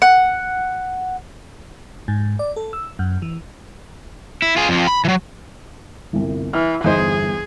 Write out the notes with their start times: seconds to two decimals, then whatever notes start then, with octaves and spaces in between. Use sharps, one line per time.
0.02 F#5
2.08 G#2
2.39 D5
2.56 A4
2.73 E6
2.99 F#2
3.22 E3
4.42 E4
4.56 F4 G#4
4.69 F2 F3
4.87 B5
5.05 E3 F#3
6.13 G1 C2
6.53 E3 F6
6.84 G1 E2 D#4 G#4 C5